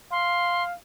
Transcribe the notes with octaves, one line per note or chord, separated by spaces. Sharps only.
F5 C6